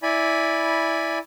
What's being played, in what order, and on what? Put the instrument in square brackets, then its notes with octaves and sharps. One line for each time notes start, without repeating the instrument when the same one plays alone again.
[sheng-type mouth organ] E4 D5 G#5 B5